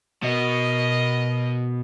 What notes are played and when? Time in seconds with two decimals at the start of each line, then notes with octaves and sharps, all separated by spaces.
0.23 B2 A#4 D#5